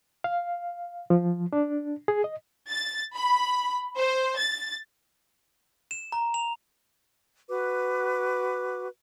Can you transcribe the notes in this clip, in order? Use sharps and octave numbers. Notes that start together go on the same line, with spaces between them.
F5
F3
D4
G#4
D#5
A6
B5
C5
A6
E7
A#5
F7
F#4 B4 D6